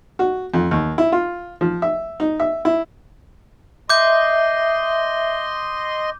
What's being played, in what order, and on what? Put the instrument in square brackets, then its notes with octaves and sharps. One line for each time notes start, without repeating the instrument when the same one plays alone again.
[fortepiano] F#4
F2
D#2
E4
F4
F3
E5
D#4
E5
E4
[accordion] D#5 C6 [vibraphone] E5 [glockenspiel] D6 G6